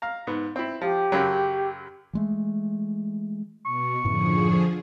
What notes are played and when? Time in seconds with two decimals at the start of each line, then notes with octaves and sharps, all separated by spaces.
0.02 F5 A#5
0.27 G#2 B3
0.56 C4 E4
0.82 F3 G4
1.12 F#2 C#3 F#3
2.13 E3 G#3 A3
3.65 B2 C#6
4.05 F#2 A2 D3 F3 G#4